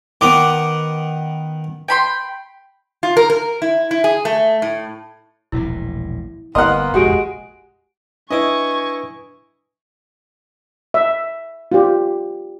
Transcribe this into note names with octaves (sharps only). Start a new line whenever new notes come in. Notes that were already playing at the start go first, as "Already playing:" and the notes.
D#3 B3 D6
G5 B5 C6
F4
A#4
A#4
E4
E4
G#4
A3
A2
E1 A#1 A2 E4
G1 A#3 B3 D#5 F#5 C6
F1 A#1 E2 G#3 F#4 G4 D7
D4 E4 B4 D#5 G#5 C#6
E5
F4 G4